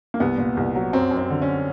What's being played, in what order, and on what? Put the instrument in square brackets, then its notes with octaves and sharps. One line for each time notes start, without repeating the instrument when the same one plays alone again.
[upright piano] A#3
C2 B3
A#2
C2
F#3
F#2 C4
F#2
C4
D3
C#4